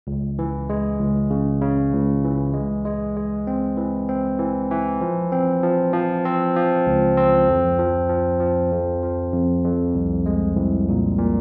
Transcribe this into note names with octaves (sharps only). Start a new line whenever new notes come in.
C#2
E3
G#3
C#2
C#3
C#3
C#2
E3
G#3
G#3
G#3
C4
E3
C4
E3
E3
F3
C4
F3
F3
C4
F3
C#2
C4
F2
F3
F3
F3
F2
F3
F2
F2
C2
G#3
C2
A#2
A#2